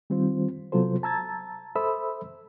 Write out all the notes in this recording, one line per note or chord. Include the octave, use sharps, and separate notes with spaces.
D#3 G3 C4 F4 C5
C3 F#3 B3 F4 A4 C5
A5 A#5 E6 G#6 A6
A4 C5 E5 B5 D#6 E6